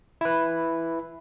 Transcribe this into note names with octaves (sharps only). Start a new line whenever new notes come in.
E4 B4